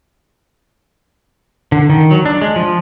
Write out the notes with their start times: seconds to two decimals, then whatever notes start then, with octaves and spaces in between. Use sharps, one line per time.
1.72 D3
1.90 D#3
2.11 F#3
2.25 D4
2.42 G#3
2.56 F3